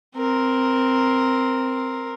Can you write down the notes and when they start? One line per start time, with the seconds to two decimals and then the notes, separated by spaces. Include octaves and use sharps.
0.16 C4 A#4